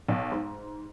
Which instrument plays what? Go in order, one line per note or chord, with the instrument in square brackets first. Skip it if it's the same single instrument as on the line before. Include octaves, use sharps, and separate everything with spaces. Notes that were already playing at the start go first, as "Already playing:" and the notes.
[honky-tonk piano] B1
G#2